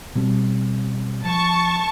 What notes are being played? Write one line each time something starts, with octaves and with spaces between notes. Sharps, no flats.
B2 G3 C4
F3 A5 C#6